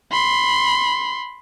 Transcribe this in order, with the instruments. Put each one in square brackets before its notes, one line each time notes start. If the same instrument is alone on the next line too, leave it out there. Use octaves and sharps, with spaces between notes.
[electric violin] B5 C6